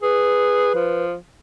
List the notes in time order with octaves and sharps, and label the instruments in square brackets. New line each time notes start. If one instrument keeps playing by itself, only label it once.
[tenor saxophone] G#4 [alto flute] B4
[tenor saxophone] F3